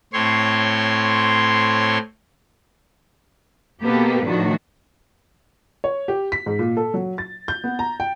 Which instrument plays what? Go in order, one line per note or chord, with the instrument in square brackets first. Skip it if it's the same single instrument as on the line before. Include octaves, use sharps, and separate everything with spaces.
[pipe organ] A2 C4 C#5 C6
[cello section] B2 A#3 B3 G4 A4 B4
A2 D#3 F3 D4 F#4
[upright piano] C#5
G4
B6
G#2
A#2
A4
F#3
A6
G6
B3
A#5
G5